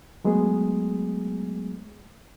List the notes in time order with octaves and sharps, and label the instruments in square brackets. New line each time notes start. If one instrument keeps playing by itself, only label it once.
[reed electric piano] F#3 G#3 A3 B3 G#4